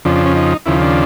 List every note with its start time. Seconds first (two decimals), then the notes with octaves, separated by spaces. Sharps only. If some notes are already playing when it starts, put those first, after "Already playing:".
0.05 F2 C#3 F3 D4
0.16 D4
0.25 C#4
0.36 D#4
0.66 D#2 C#3 F3 E4
0.81 D4